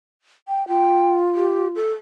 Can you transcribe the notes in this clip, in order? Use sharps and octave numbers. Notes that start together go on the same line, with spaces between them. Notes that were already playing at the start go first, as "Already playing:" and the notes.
G5
F4 G5
G4
A4